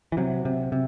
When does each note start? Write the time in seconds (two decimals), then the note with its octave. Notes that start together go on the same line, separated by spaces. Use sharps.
0.12 E3
0.17 C3 F#3
0.45 C3
0.72 C3